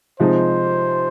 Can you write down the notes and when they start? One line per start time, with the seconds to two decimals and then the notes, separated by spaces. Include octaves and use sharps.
0.20 C3 F3 G#3 D#4 C5